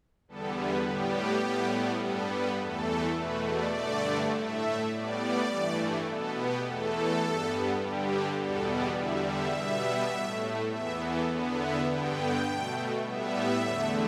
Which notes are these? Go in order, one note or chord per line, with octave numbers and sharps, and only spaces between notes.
E2 D3 G3 B3 A4
B4
A2 G3 B3 G4
A2 G3 B3
G2 G3 B3 A4
B4
E2 E3 A3 A4
E2 B2 A3 B4
D5
G2 D3 A3
A2 A3 E5
A2 G3 B3 D5
G2 E3 A3
B2 B3 A4
G4
E2 E3 A3 A4
G2 G3 B3
G2 D3 G3 G4
E2 B2 G3 B3 A4
D5
E2 D3 G3 E5
E5
B2 G3 B3
A2 A3
E2 E3 B3 E5
A4
E2 D3 B3
E5
G2 D3 B3 G5
B2 A3
A2 G3 B3 E5
E2 D3 A3